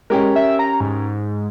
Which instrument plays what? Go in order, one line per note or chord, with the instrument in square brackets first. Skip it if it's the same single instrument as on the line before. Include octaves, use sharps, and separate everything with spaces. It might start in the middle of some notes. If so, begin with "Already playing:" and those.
[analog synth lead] G#3 [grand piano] C#4 G4 A#4
[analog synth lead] E5
A#5
G#2